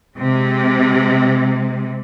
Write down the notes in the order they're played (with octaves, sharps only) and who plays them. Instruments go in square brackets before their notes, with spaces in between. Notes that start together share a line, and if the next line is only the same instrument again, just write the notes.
[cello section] C3 G#3